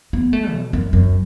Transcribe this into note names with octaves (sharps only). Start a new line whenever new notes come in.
B3
A3
B2
F#2
F#2